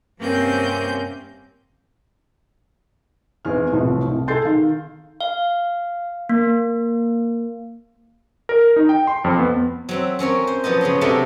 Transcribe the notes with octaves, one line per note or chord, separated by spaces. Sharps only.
G2 C3 A#3 C4 C#4 G6
G#1 E2 E3 G#4 F6
C2 A2 E3 F3
C2
G#4 A4 C6 G6 A6 C7
D#3 F5
F5
A#3
A#4
D#4
G5
C6
F2
B3
F#3 C4 E5
C4 C#4 A#4 C#5
C5
F3 F#3 B3 F4 D#5
C#3 B3 C#5 C6
C3 F#3 G3 A3 D4 D#5